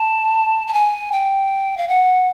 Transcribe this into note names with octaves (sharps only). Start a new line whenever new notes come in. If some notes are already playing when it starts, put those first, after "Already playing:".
Already playing: A5
A5
G#5
G5
F5
F#5